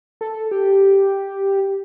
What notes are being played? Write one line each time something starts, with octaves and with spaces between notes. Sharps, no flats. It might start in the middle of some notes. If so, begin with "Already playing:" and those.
A4
G4